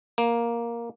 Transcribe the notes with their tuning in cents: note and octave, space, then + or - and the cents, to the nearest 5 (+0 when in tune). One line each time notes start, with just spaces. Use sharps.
A#3 +5